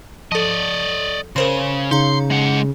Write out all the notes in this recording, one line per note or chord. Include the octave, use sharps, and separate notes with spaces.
F3 A4 D5 D#5
C#3 A#4 C5 C6
C#3 D#4 F5 A#5 C6
G#3 F#5